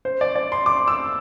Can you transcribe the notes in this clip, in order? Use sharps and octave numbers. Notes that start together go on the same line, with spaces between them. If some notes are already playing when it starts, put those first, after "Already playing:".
C5
D5
D5
C6
D6
E6